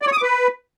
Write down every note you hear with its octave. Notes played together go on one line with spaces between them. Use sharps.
D5
C#5
D#6
D6
B4